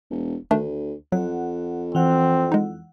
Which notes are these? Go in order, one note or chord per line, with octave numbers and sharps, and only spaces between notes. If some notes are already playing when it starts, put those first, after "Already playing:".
E1
D2 D#3 A3 D4
F2 F#3 F#5
E3 C4 F#5
G#3 D#4